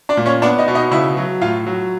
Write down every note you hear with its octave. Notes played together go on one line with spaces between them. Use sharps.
D4 D5
A#2
C#4 C#5
B3 D4 D5
D#4 D#5
B2
D#4 D#5
C#3 E4 E5
F#3
A2 F4 F5
F#3